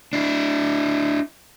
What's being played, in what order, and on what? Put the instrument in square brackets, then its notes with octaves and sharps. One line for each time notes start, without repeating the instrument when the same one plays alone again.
[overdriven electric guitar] D4 E4